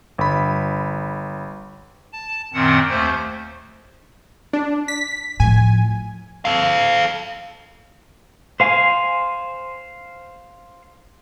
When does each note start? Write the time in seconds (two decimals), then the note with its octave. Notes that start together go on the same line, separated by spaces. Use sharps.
0.18 G1 B5
2.13 A5
2.54 F#2 A#2 D#3 C4 F#5
2.90 D#2 A3 C5
4.53 D4
4.88 B6
5.40 A2 F3 G#5
6.45 A4 F5
8.60 C5 F5 G#5